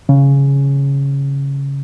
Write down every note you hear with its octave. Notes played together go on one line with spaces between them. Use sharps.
C#3